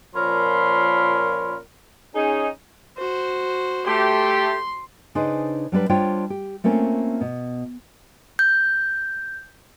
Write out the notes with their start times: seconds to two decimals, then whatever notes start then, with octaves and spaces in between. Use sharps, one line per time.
0.15 A#2 F3 C#4 A#4 B5 C6
2.15 C#4 D#4 G#4
2.97 F#4 C5
3.87 A3 G4 C6
5.15 C#3 D4 D#4 G#4 B4 C5
5.72 F#3 G3 D4 B4
5.89 G3 D4 F4 C5 C#5 G5
6.30 G4
6.64 A3 A#3 C4 C#4 F4
7.21 B2
8.39 G6